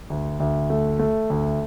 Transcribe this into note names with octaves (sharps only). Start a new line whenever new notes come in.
D2
D2
A3
A3
D2